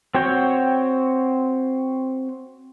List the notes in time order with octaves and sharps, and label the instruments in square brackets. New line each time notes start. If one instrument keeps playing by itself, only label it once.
[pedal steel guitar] C4 F#4 C#5 G5